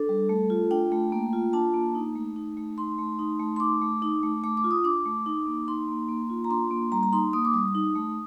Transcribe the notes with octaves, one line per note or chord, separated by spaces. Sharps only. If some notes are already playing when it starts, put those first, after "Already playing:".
Already playing: D4 A4
G3
A3
F4
D4 G5
A3
A#3
F4
D4 A5
A#3
D#4
A3
D#4
A3
D#4 C6
A3
D#4
A3
C6
D#4 D6
A3
D#4
A3
A3 D6
D6
F4
D#6
D4 D6
A3
D#4
A#3
D#4 C6
A#3
A#3
F4
A#5
D4 C6
A#3
G3 A#5
A#5
D#4 C6
A#3 D#6
D6
G3 D#6
D#4
A3